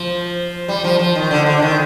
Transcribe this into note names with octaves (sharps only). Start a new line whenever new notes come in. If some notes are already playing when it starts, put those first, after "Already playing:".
Already playing: F3
G3
F3
F3
D#3
D3
D3
D#3